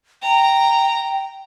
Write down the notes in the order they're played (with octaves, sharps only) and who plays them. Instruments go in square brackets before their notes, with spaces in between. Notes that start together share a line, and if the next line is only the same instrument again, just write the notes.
[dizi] G5 [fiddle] A#5